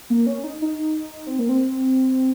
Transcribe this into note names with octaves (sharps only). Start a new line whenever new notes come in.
A#3
C#4
D#4
D#4
C4
A#3
C4